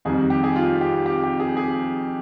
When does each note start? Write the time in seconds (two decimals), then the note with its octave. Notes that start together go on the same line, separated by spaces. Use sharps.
0.05 F2 D#3 G3 G#4
0.30 G4
0.44 G#4
0.56 F4
0.81 G4
1.06 G4
1.24 G4
1.40 G#4
1.57 G#4